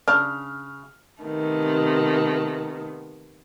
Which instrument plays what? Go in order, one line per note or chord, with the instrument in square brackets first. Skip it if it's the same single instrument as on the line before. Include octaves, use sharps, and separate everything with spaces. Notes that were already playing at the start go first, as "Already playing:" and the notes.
[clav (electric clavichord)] C#3 [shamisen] D4 [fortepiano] F6
[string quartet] C3 D#3 A3 B3